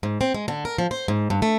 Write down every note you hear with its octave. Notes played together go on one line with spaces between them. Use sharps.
G#2
C4
G#3
D3
A#4
F3
C5
G#2
G2
A3